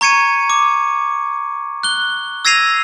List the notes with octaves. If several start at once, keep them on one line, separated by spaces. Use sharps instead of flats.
A#5 C#6 G#6 C#7 D#7
D6
F#6 G7
E6 G#6 A#6 C7 D#7 F7